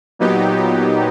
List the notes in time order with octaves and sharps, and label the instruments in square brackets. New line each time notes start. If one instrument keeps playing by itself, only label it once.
[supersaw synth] A#2 F#3 B3 D#4 G4